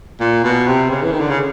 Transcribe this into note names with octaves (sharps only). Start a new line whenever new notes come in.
A#2
B2
C3
C#3
E3
D#3
D3
C#3